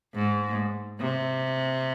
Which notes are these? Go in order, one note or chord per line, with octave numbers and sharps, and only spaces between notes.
G#2
C3